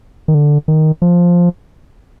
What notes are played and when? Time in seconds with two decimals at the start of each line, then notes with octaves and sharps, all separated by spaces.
0.28 D#3
0.34 D3
0.68 D#3
1.02 F3